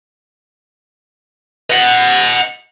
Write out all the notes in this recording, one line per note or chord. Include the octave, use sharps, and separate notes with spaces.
D#5 F#5